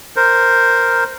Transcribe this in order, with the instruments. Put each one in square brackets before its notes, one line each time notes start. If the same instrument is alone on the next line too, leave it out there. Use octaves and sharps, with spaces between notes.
[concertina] A#4 C5